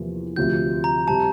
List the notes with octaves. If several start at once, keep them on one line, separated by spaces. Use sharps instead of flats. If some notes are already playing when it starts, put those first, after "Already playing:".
Already playing: E2 C3 F3 A#3
D2 C3 F3 C4 F4 G6
A#5
C3 G3 C4 A5